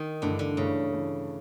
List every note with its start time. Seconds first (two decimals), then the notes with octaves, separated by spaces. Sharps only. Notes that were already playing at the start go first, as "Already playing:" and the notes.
Already playing: D#3
0.22 G2 D3 E3 A3
0.39 D3
0.57 G2 C#3 E3 A3
0.92 E3 A3